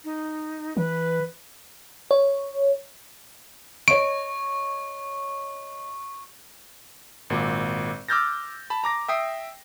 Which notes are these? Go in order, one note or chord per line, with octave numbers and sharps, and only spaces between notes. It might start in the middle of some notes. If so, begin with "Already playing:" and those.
D#4
E3 B4
C#5
C#5 D#5 C#6 D7
G#1 A#2 F#4
D6 E6 F6 G6 A6 A#6
A5 B5
A#5 D6 A#6
E5 G5 D#6 C7